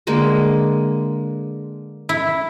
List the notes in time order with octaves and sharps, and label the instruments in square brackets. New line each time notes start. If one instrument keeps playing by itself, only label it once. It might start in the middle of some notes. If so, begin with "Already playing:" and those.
[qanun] D3 G#3 A#3
[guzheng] E4